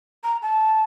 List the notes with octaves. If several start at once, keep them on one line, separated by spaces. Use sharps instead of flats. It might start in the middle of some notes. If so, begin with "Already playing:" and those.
A#5
A5